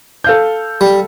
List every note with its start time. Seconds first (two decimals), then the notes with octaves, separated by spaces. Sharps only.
0.24 A4 F5 G6
0.81 G3